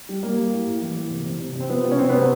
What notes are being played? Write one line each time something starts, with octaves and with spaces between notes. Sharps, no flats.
G3
G3 A#3
G3
A2
A2
E3
E3
C3
C3
C3
C3
C4
F3 B3
C3
C#4
C3 C4
C3 B3
C4